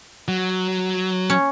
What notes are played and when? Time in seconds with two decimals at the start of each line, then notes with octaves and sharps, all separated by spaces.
0.28 F#3
1.30 C#4